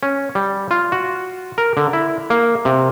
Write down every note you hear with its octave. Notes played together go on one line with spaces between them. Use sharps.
C#4
G3
F4
F#4
A#4
D3
E4
A#3
C3